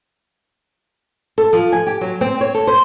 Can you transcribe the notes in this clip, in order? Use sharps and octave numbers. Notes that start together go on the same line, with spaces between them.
A4
F3
G#5
G4
F#3
C4
C#5
A4
C5